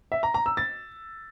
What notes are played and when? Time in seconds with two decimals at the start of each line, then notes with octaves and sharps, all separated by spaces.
0.12 E5
0.23 A#5
0.34 A#5
0.46 E6
0.57 A6